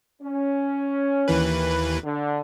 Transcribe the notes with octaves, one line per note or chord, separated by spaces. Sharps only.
C#4
D#2 E3 B4
D3